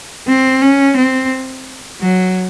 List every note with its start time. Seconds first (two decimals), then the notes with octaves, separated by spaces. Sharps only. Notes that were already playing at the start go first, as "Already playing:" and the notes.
0.27 C4
0.62 C#4
0.97 C4
2.01 F#3